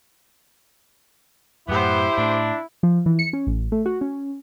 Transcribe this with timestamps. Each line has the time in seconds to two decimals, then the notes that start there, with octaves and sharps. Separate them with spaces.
1.69 F#2 A2 B3 E4 G4 C5
2.18 A2 D4
2.83 F3
3.06 E3
3.19 C#7
3.33 C#4
3.47 A1
3.72 A3
3.86 F#4
4.01 C#4